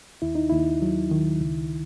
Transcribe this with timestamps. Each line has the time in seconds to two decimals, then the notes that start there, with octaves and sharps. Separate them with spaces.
0.22 D#2 E4
0.35 D#4
0.49 D#2 E4
0.82 F#3
1.11 D#3
1.41 C#2